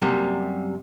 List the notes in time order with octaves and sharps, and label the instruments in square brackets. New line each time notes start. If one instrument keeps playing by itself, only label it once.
[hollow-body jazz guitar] F#2 C3 G3 A#3